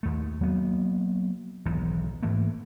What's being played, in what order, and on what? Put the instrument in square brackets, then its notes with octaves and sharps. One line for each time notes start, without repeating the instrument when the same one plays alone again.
[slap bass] D#2 A3
F#3 A#3 B3
D#1 B1 G#2 E3
G#2 E3 A3 A#3